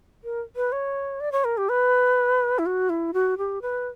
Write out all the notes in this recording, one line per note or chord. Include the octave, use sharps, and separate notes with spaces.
A#4
B4
C#5
D5
C#5
A#4
G4
B4
E4
F#4
E4
F#4
G4
B4